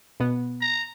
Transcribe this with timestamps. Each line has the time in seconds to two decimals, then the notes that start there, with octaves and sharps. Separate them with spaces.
0.20 B2 B3
0.61 A#5